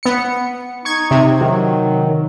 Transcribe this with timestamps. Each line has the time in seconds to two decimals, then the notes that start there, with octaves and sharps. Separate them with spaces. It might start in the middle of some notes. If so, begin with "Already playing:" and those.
0.03 B3 C#7
0.85 D#4 C#6 G#6
1.11 C3
1.41 D#3 F#3